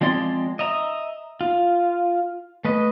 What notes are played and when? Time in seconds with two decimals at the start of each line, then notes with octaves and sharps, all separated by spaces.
0.01 F3 G#3 C4 D5 C6
0.59 D#5 E5 A#5
1.41 F4
2.65 A3 B4 D#5